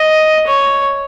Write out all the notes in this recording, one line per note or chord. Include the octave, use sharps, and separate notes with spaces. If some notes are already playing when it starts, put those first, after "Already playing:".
Already playing: D#5
C#5